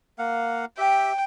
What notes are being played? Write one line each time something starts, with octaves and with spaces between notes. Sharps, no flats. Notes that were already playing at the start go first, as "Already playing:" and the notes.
A#3 F5 F#5
G4 E5 G5